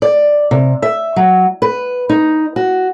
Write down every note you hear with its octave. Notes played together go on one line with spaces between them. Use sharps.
D5
C3
E5
F#3
B4
D#4
F#4